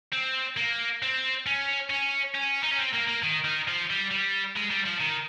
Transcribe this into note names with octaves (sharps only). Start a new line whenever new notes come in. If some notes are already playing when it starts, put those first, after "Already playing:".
C4
A#3
C4
C#4
C#4
C#4
D#4
C#4
C4
A#3
A#3
D#3
D#3
F3
G3
G3
G#3
G3
F3
D#3